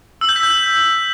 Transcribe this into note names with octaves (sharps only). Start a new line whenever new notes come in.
E6
G6
B6
G6